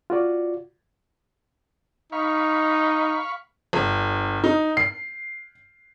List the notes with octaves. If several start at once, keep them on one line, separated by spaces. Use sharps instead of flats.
F4 F#4 D5
D#4 F5 B5 C#6
G1
D#4
C7